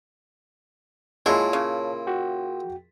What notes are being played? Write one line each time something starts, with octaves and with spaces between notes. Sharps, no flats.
A#2 G#3 E4 G#4 A#4 C#5 A5
C#3
F#4 G5